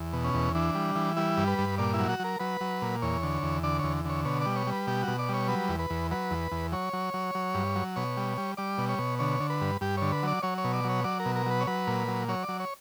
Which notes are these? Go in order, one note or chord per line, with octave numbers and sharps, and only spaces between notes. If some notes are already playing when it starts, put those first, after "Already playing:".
Already playing: E2
B2
C#4
E2
E3 D4
G3
E3
G3 E4
G2
B4
G2
A#2 D5
E4
F#3
F#4
F#3 A#4
F#3 B4
F#3
A#2
E2 C#5
D3
E2
D3 D5
E2 C#5
D3 C#5
B2 C#5
G3 D5
C#5
G3
B4
B2 G4
F#4
B2
D5
G3 C#5
F#3 B4
E2
B4
E2
F#3 B4
E2
E2
F#3 C#5
F#3
F#3
F#3
G2
F#3
B2 C#5
G3
G3
G3 D5
B2
C#5
B2
D3 C#5
D3
B4
G2
G2 G4
D3 C#5
B4
F#3 D5
F#3 C#5
C#5
B2
D5
F#3 C#5
F#3 D5
A#4
B2
A#4
F#3 B4
C#5
F#3 B4
A#2
F#3
F#3 C#5
D5
F#3
C#5